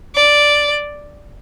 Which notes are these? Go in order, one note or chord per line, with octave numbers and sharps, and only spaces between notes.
D5